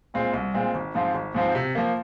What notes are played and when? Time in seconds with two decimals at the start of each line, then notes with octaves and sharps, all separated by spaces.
0.14 A#2 G#3 C4 F4
0.33 C2
0.54 A#2 G#3 C4 F4
0.74 G#1
0.95 G#2 F3 C4 F4
1.15 G#1
1.35 G#2 F3 C4 F4
1.55 C3
1.75 F3 A#3